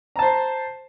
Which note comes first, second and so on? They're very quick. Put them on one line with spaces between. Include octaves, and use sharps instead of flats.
A#5 A5 C5